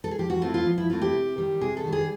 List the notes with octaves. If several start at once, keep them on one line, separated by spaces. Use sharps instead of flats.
A4
G#4
F3 G4
F#4
A3 C4 E4 F4
F4
F3
E4
A3 C4 E4 F4
G4
C3
D#3 G3
C3 G#4
A4
D#3 G3
G#4